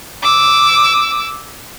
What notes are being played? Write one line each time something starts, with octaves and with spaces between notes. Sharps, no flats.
D6 E6